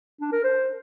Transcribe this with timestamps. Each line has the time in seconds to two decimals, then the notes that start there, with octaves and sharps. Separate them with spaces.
0.21 D4
0.32 A#4
0.44 C5